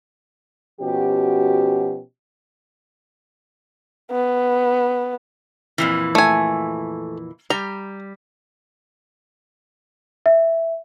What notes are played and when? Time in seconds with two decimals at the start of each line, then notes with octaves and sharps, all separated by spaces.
0.81 B2 F3 C#4 F#4 G4
4.11 B3
5.78 F2 A#2 E3
6.15 A3 G#5
7.50 G3 A#5
10.26 E5